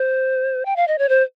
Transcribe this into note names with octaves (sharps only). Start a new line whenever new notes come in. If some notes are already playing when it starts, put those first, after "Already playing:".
Already playing: C5
G5
F5
D#5
C#5
C5